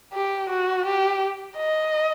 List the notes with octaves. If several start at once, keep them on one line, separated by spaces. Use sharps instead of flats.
G4
F#4
G4
D#5